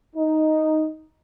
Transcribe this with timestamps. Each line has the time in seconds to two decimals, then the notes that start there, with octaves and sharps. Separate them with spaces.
0.16 D#4